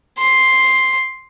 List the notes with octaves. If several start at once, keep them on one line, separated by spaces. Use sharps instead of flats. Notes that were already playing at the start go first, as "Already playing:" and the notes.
C6